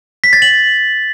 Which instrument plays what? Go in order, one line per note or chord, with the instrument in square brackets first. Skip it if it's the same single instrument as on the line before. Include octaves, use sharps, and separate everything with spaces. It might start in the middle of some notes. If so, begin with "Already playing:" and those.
[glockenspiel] B6
A6
F#7